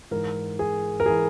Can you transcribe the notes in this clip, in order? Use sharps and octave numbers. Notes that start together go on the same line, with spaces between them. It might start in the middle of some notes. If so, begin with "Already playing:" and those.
G#2 E3 A#4
G#4
A#4
E3 G#4